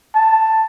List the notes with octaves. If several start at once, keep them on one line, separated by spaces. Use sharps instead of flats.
A5